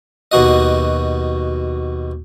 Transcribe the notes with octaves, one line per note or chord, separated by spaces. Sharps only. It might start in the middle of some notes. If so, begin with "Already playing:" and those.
D#2 B2 F#4 D#5